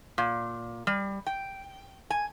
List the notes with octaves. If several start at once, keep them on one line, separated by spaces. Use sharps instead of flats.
A#2
G3
G5
G#5